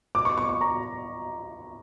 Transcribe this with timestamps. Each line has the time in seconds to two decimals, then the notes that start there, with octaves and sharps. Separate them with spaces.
0.15 D6
0.25 C#6
0.38 C#6
0.49 C#6
0.61 A#5